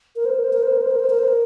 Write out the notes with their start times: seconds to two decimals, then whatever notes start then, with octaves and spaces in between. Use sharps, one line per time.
0.16 A#4
0.25 C5
0.34 A#4
0.44 C5
0.53 A#4
0.63 C5
0.72 A#4
0.82 C5
0.91 A#4
1.00 C5
1.10 A#4
1.19 C5
1.28 A#4